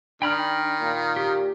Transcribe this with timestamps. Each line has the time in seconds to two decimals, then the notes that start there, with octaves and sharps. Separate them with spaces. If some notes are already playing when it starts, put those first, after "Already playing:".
0.22 D#3 D4 G5 B5 F6
0.81 A#2
1.16 G4